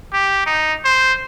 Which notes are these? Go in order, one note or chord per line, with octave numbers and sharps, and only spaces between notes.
G4
D#4
C5